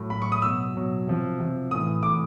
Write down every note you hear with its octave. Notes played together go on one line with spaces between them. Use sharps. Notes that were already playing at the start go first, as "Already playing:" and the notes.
Already playing: A2 F#3
A2 F#3 B5
C#6
D#6
B2 F#3 E6
B2 F#3
C3 F3
C3 F3
A2 E3 D#6
A2 E3 D6